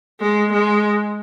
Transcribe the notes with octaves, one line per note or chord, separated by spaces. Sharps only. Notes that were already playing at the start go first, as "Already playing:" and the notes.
G#3
G#3